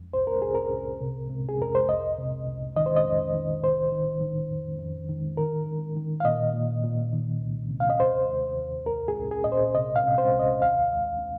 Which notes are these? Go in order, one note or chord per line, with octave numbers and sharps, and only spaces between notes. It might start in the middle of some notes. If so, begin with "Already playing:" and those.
Already playing: F2
C2 C5
A#4
C2 G#4
A#4
C2
C3
C3
G#4
F2 A#4
C5
C2 D#5
C3
C2
D#3 D#5
C5
D#5
F2
D#3
C2 C5
D#3
D#3
F2
F2
D#3
D#3 A#4
D#3
D#3
F5
A#2 D#5
A#2
A#2
D#3
C2
C3
F5
D#5
D#2 C5
D#2
D#2
C2 A#4
G#4
C2
G#4
A#2 D#5
C5
C3 D#5
F5
C3
C5
C2
D#5
D#2 F5
D#2